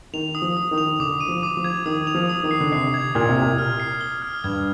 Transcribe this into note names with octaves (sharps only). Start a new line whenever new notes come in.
D#3 F7
D#6
F3
D#6
D#3
F7
D3 D6
D#7
F3
D6
F3
G#6
D#3 D#6
F7
F3
D#6
D#3
C7
D3
C3 C7
G#6
A#2 G#6
C3
G#6
A#2
F6
C7
G7
F6
G2 G#6